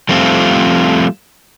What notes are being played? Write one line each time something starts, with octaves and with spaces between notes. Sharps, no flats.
F3 G3 A3 C4 F4